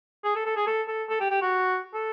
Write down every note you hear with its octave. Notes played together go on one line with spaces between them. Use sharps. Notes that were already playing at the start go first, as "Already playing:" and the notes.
G#4
A4
A4
G#4
A4
A4
A4
G4
G4
F#4
A4